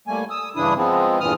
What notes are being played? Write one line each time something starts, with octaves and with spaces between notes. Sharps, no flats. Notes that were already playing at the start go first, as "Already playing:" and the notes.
A2 G3 A3 A#3 G#5
D#6 E6
G2 C#3 E3 D4 E4 D#6
F3 G#3 B3 C4
E2 G2 A#2 E3 D#6 F6